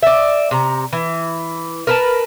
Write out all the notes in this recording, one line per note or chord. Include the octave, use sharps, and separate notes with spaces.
D5 E5
C3 A#5
E3
A#4 B4 A5